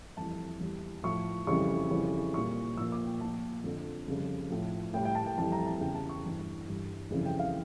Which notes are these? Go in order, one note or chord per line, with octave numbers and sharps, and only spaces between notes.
F2 E3 G3 A5
E2 E3 G3
A2 F3 C#6
F2 C#3 E3 G3 C#6
F2 C#3 E3 G3
A#2 G3 C#6
A#2 F3 E6
D6
G5
A#2 F3 A5
F2 D3 F3
F2 C#3 G3
A2 F3
A2 G3 G5
G5
A5
G5
F2 E3 G3 A5
A#5
A5
E2 C#3 G3 G5
A5
C#6
G2 E3 G3
G2 E3 G3
F2 C#3 E3 G3
G5
F5